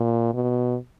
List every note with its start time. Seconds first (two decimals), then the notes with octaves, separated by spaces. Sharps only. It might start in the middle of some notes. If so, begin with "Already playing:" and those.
Already playing: A#2
0.34 B2